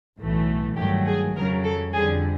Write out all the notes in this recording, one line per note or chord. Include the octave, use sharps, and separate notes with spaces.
B1 A2 E3 A3
G2 D#3 F#3 A3 G4
G#4
F2 C#3 F#3 A#4
A4
F2 D3 G3 G#4